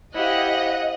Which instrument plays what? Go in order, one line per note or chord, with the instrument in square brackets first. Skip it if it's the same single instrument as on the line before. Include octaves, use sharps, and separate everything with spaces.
[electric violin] E4 G4 [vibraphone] C5 F5 [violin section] D#5 [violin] F#5 F#6